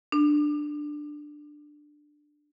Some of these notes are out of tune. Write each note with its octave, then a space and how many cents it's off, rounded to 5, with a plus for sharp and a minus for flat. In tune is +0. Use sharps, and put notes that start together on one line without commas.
D4 +10